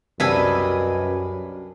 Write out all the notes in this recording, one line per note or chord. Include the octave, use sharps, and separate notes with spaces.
C2 F#2 G3 D4 B4 D#5 G#5 E6